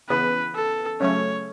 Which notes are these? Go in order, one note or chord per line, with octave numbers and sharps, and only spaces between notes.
C#3 E3 B3 B4
A4
C#3 F#3 A3 C#4 C#5